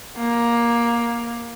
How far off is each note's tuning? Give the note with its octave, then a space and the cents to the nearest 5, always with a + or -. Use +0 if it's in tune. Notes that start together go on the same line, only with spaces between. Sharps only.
A#3 +10